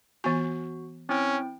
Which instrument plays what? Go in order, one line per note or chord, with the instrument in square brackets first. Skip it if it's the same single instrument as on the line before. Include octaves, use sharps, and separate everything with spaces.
[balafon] E3 B3 G#5 [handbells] F#4
[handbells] C4 E4 G5 [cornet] C#4